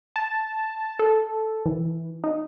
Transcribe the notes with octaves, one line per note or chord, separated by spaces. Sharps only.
A5
A4
E3
D#4